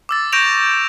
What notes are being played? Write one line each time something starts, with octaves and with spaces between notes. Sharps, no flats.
D6 E6 A6
C#6 G6 A#6 D7 E7 F7